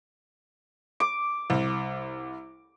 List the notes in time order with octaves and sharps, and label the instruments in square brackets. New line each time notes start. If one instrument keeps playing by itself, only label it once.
[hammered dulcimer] D6
[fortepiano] C2